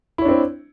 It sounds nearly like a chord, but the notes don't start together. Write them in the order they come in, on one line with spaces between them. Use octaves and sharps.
E4 C#5 D4 C4